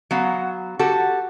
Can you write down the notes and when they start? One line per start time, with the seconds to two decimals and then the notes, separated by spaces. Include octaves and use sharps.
0.11 F#3 B3 F5 F#5
0.79 F#4 G4 A4